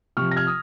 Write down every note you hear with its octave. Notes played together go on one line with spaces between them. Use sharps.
C3 F3 C#6 F6
A#6
F6 G#6
D#6